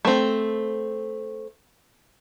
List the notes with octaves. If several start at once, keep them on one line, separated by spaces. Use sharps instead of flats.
A3 C4